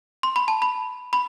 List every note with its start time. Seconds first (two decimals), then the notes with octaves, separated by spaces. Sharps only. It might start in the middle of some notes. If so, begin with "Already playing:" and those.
0.23 C6
0.36 B5
0.48 A5
0.62 B5
1.13 B5